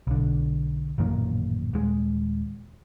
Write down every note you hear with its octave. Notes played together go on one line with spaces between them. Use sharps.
B1 D3
A1 F#2 A#2 D#3
D#1 G#3